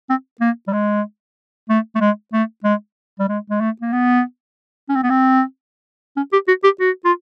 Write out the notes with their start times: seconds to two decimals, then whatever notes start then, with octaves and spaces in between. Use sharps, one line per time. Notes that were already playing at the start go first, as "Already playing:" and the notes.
0.10 C4
0.41 A#3
0.67 G3
0.73 G#3
1.69 A3
1.95 A3
2.01 G#3
2.33 A3
2.64 G#3
3.20 G3
3.29 G#3
3.50 G#3
3.60 A3
3.81 A#3
3.93 B3
4.89 C#4
4.95 C4
5.03 B3
5.10 C4
6.17 C#4
6.33 G4
6.48 F#4
6.64 G4
6.80 F#4
7.05 F4